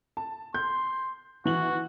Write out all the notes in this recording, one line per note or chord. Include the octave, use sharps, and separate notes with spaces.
A5
C6 G6
E3 F#4 F#7